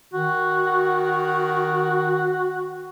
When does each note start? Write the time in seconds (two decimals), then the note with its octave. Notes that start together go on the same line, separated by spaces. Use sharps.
0.13 D#3 F#4